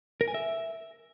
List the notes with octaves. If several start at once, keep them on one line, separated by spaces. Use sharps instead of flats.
A#4
G#5
E5